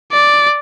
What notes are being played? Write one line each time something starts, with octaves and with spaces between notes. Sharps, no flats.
D5